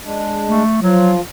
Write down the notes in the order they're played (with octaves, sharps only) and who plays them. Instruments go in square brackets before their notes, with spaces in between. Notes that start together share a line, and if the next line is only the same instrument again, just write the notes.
[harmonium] G#3 D4
[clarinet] A3
[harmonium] F3 F4 [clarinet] F#3